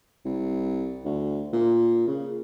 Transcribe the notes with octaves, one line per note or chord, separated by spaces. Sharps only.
C2
D2
A#2
C#3